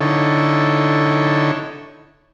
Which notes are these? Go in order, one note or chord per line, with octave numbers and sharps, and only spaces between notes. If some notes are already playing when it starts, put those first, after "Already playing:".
D3 D#4 E4 A4 C#5